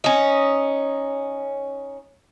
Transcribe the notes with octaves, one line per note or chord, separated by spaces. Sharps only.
C#4 D#4